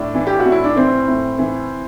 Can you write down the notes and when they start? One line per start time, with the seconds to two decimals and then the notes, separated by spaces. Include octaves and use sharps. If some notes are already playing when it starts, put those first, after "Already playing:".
Already playing: A2 D4
0.14 E3
0.27 G4
0.40 F#4
0.45 A2
0.52 E4
0.64 D4
0.77 E3 C4
1.07 A2
1.38 E3